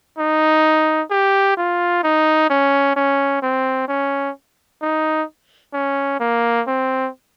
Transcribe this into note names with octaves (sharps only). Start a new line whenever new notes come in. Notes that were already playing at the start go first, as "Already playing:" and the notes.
D#4
G4
F4
D#4
C#4
C#4
C4
C#4
D#4
C#4
A#3
C4